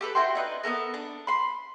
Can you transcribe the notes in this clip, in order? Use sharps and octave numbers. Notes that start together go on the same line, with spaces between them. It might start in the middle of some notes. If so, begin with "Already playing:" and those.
G4 A4 B4
E4 F#4 G5 C6
D4 D#4 B4
B3 C#4 A4 A#4
D4
B5 C6